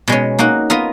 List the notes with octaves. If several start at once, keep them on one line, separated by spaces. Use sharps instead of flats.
B2 G#3 C#4
A#3 D#4 F#4
B3 F4 A#4 D#5